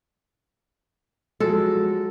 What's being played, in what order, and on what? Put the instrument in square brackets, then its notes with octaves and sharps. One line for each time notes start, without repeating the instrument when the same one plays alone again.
[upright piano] F3 F#3 G#3 [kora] A4